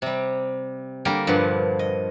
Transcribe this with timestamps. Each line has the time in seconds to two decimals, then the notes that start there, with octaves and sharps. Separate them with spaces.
0.02 C3 G3
1.05 D3 G3 A#3 G4 A#4
1.27 G2 A#2 F3 B4 F#5
1.79 D#5